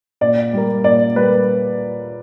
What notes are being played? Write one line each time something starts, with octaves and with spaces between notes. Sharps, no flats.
A#2 D5
G3 A#3
A#2 D5
G3 A#3 B4